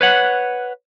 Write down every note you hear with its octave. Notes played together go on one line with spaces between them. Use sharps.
B4 C#5 F#5